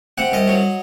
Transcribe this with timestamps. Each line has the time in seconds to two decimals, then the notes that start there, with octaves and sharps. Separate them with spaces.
0.18 C3 F#5
0.32 C2 D#5
0.48 F#3